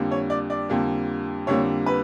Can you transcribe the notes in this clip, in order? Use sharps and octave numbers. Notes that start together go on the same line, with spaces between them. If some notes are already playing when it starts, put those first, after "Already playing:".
Already playing: F2 D3 G3 A#3
C#5
D5
D5
F2 D3 G3 A#3
F2 D3 G3 A#3 C#5
B4